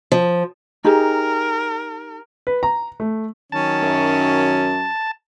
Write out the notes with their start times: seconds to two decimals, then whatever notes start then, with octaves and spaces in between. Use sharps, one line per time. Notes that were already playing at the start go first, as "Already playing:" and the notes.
0.12 F3
0.85 D#4 G4 G#4 A#4
2.47 B4
2.63 A#5
3.00 A3
3.52 D#3 F#3 C#4 A5
3.83 F#2